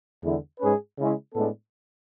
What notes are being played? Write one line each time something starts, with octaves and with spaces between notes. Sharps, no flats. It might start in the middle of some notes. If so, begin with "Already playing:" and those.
E2 D3 G#3 B3 E4
G#2 G#3 C#4 G#4 B4
C#3 G#3 C#4 E4
A2 G#3 B3 D4 A4